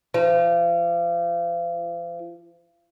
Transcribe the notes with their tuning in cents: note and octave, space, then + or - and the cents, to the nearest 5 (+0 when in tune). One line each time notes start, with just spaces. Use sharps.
F3 -35